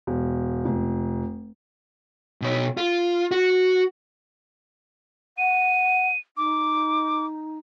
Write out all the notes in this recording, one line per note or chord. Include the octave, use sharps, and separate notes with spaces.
E1
F1
B2 C#5
F4
F#4
F#5 D#7
D#4 D6